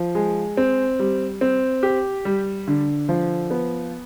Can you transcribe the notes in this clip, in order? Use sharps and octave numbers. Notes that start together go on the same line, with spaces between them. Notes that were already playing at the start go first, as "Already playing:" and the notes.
Already playing: F3
G#3
C4
G3
C4
G4
G3
D3
F3
B3